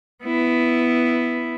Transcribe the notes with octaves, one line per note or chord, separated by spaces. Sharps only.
B3 E4